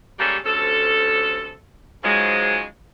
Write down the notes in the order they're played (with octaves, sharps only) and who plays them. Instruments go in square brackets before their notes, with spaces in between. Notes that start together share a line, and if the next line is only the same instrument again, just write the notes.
[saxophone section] G3 G#3 A#3 C#4 G4 A4
D2 C3 C#4 A4
G#2 C#3 F3 F#3 G#3